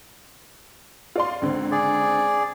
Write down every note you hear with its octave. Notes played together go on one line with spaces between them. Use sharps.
F4 D5 C6
C#2 D3 C4
G#4 D5